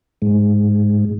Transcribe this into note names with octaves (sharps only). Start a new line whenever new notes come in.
G#2